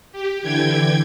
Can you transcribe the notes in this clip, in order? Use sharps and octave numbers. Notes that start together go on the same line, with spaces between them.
G4
D3 E3 G5 G#6